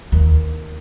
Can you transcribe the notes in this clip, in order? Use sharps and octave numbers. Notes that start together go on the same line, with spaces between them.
D#2